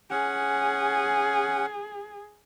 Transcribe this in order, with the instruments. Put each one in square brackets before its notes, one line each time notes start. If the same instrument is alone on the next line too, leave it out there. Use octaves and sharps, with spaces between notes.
[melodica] C#4 F#5 [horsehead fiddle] G#4